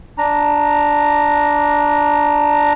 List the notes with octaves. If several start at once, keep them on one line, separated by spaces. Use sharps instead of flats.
D4 A#5